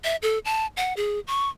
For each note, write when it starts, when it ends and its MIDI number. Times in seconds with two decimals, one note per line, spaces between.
0.04 0.16 76
0.22 0.39 69
0.45 0.67 81
0.77 0.94 78
0.97 1.20 68
1.27 1.49 85